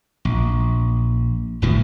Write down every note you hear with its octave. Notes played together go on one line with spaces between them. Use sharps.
A#1
G1 A2 D#3 E3